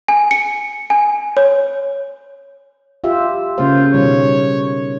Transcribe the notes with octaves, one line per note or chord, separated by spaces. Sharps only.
G#5
C#7
G#5
C#5
F4 G4 E5
C#3 A#3 F4 C5
B2 D#3 G3 C#5